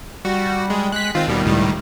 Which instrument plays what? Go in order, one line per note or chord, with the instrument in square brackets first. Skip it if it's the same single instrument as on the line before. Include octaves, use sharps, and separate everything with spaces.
[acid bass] G3 [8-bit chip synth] F#4
[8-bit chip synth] G#3
[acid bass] G#3 [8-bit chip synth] F#6 B6
[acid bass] D#3 [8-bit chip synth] C4 F4
[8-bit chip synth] D#2 B2 G3
C#2 A2 G3